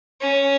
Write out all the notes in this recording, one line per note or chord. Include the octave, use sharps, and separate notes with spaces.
C#4